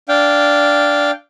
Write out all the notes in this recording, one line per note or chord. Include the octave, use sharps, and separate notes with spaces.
D4 F5 G5